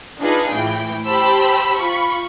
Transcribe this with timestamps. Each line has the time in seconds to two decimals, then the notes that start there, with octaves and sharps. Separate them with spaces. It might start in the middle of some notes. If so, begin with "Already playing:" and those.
0.21 D4 D#4 F4 G#4 B4
0.52 A2 E3 G5
1.07 G4 C5 G5 A5 B5 E6
1.80 F4 B5 C#6